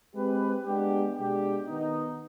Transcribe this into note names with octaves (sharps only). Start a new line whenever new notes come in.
G#3 C4 G4 B4
G#3 B3 D4 G4
B2 G#3 D4 G4
D#3 B3 D#4